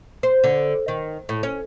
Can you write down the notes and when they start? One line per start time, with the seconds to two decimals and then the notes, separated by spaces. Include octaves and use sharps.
0.23 C5
0.44 D3
0.88 D#3
1.29 A2
1.43 C#4